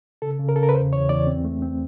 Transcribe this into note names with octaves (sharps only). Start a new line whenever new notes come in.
C#3 A4
C#3
A#4
C#3 A4
A#4
B4
E2 C5
E2 C#5
E2 D5
C4
A3
C4